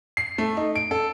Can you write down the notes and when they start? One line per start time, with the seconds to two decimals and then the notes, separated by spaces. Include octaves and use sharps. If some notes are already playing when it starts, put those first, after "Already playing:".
0.17 C7
0.38 A3
0.57 D#4
0.75 D7
0.91 A4